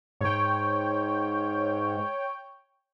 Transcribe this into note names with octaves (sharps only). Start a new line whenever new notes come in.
G#2 C#5 G5